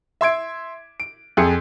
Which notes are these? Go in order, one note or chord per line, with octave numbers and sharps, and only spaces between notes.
E5 C6 G#6 D7
D7
F2 G#4 C#7